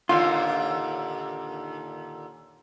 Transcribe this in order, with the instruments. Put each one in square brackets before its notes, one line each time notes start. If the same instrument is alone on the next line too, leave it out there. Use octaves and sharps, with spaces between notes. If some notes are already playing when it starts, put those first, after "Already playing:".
[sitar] D#2 A#2 D3 [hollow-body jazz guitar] F4